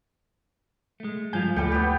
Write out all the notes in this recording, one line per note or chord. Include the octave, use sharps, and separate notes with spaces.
G#3 A3
G2 F3 F4 G#5 G6
D2 A2 G3 A3 G5
B3 G4